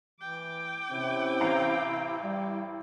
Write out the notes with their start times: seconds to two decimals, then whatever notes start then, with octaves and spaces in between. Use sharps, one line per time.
0.20 E3 G5 D6
0.91 C3 C4 C#4 E4
1.41 A1 F5 A#5
2.23 G3 E4